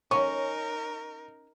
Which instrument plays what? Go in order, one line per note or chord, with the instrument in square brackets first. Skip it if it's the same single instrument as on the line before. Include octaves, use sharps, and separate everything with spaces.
[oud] C#4 [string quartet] D#4 A#4 [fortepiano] C#6